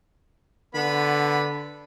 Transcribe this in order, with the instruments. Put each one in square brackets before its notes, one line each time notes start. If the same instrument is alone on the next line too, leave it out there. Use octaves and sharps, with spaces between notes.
[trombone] D3 [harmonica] B3 B5